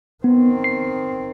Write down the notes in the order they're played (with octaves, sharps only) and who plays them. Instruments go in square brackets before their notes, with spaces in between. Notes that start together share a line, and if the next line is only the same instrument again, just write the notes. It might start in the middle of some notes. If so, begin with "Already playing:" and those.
[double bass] D#3 C4 [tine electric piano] B3
[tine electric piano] C7